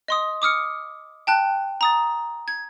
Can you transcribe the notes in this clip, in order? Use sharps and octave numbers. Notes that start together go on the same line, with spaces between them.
D#5 C6 D#6
D6 D#6 F6 C#7
G5 A5 F#6
A#5 D#6 A6
G#6